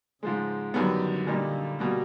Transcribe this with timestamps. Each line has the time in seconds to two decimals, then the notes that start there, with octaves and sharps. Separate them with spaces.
0.22 G#2 C#3 F3 G#3
0.74 F#2 D3 D#3 G3 B3
1.27 A#2 G3 A#3 D#4
1.79 B2 G3 A#3